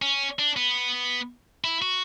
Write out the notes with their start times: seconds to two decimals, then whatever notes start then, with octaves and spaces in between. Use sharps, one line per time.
0.02 C#4
0.39 D4
0.56 B3
1.64 E4
1.82 F#4